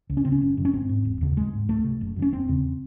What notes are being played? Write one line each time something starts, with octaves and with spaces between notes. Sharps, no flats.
C#2
C#4
C#3 C4
C#4
F#1
F#2 C#3
C#4
G#1 C4
G#2
E1
D#2 C#3
G#1 G#3
G#2
C#2 A3
C3
F#1
F#2 C#3
C#4
E1 C4
E2 C#3